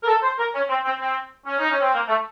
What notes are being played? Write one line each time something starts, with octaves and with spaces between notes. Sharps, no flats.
A#4
A4
C5
A#4
C#4
C4
C4
C4
C#4
D#4
C#4
C4
A#3
A3